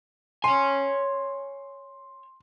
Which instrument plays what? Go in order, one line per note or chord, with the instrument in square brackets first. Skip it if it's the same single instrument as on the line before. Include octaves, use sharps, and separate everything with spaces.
[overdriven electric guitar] C#5 G#5 [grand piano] C6